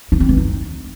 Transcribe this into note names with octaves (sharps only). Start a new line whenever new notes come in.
D#4
C4
E3
D#4